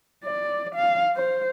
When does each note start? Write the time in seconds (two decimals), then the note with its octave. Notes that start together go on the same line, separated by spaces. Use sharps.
0.24 D5
0.75 F5
1.16 C5